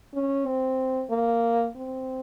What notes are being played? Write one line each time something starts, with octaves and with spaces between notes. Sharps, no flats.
C#4
C4
A#3
C4